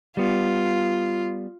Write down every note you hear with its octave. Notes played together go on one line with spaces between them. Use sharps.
G3 B3 F4